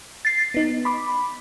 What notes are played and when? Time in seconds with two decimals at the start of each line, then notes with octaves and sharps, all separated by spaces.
0.25 A6 C7
0.54 B3 D#4
0.85 B5 D6